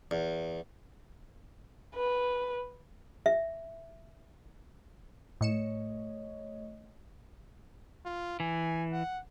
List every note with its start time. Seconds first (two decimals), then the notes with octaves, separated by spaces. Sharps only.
0.11 E2
1.95 B4
3.26 E5
5.41 A2 A3 C#5 D#5 C#7 E7
8.06 F4
8.40 E3 G#5
8.93 F#5